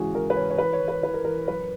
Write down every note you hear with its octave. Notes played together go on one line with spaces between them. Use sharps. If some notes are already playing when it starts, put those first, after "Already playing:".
Already playing: G#2 C#3 E3 F#4 G#4
E3 A#4
B4
E3 C#5
C#5
E3 B4
C#5
E3
B4
E3 B4
A#4
E3 A#4
F#2 B4